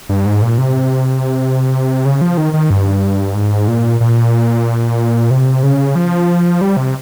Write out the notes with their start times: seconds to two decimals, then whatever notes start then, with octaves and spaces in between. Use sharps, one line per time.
0.09 G2
0.26 G#2
0.42 A#2
0.58 C3
2.05 C#3
2.21 F3
2.37 D#3
2.54 D#3
2.70 G2
3.35 G#2
3.68 A#2
4.01 A#2
5.31 C3
5.63 C#3
5.95 F3
6.61 G3
6.77 C3